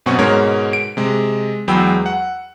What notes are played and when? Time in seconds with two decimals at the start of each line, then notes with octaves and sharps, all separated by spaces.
0.06 F#2 B2 C4 C#4 F#5 C#6
0.18 G#2 B2 G#3 A#4 C#5
0.73 D7
0.97 C3 G#3
1.68 E2 F#3 G#3 G5 B5 E6
2.06 F#5